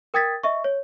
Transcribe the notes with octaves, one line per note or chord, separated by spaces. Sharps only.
A#4 G5 D#6 G#6 A6 B6
D#5 E5 C#6
C#5